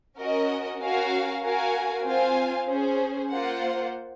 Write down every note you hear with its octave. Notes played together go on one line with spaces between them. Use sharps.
C#4 F#4 A#4 D#5
C#4 F#4 A#4 F5 G#5
F#4 A#4 F5 G#5
C4 F4 C5 F5 G#5
C#4 G#4 C5
A#3 F4 C5 F#5